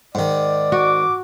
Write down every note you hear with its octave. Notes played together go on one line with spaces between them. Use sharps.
G#2 D#3 D5
F#4 D6